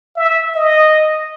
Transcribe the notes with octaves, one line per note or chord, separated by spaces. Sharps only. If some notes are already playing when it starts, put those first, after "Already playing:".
E5
D#5